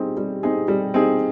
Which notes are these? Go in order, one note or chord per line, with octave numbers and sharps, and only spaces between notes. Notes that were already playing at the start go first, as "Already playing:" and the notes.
Already playing: G3 C4 D#4 G#4
G3
C4 D#4 G#4
G3
C4 D#4 G#4